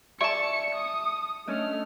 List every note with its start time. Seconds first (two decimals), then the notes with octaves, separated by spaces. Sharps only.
0.21 G#4 D5 E5 A5 C#6 C#7
0.75 D#6
1.47 A3 C#4 D4 D#5 F6